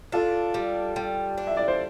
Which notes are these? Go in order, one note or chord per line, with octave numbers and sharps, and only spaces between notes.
D4 F4 A4
G3
G3
D4
E5
D5
C5